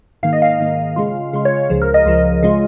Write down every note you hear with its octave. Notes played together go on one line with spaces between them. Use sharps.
G#2 D#3 A#3 F5
D#5
F5
G#2 D#3 A#3
C#3 G#3 F4
C#3 G#3 F4
C#5
C#2 C#3 F3
A#4
D#5
C#2 C#3 F3
C#3 G#3 F4